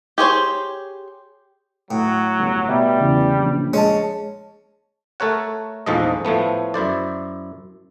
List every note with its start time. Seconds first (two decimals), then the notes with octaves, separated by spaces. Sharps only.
0.18 G4 G#4 C5 C#5
1.91 A2 F#3
2.39 G1
2.69 B2 G3 E5
3.01 E2 C#3 E3 C#4
3.40 A#1
3.73 G#3 C#4 C#5 A5
5.20 A3 A4 A#4 C#5 F#5
5.86 A#1 E2 G#2 F3 A4 D#5
6.25 A2 F3 A3 B3
6.74 F#2 E4 C5 D5